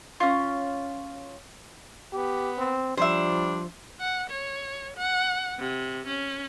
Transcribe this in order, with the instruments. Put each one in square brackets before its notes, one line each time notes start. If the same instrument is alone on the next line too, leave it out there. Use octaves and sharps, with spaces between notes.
[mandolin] C#4 F4
[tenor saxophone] B3 [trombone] G4
[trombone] C4
[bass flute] F3 [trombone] G3 [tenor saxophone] D4 [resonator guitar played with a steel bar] C5 E5
[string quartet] F#5
C#5
F#5
C3
C#4